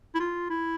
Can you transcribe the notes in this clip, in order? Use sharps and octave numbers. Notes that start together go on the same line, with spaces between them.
E4
F4
E4